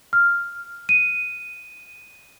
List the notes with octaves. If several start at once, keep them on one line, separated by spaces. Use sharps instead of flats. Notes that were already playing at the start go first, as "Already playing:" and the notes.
F6
D#7